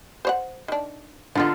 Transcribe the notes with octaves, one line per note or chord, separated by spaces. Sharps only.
C5 C#5 F#5
D#3 D4
D3 F3 B3 D#4 F4 A4